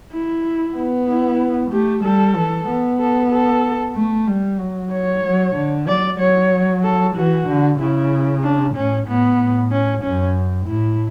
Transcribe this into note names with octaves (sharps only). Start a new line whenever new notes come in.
E4
B3
E4
A3 G4
G3 A4
E3
B3
A4
A4
A3
G3
F#3
C#5
F#3
D3
F#3 D5
F#3 C#5
A4
E3 F#4
D3
C#3 E4
D4
A2 C#4
A2 B3
A2
C#4
F#2 C#4
A2 E4